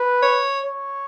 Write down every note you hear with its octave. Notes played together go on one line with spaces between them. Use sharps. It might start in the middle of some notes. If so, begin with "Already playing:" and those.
Already playing: B4
C#5
C#5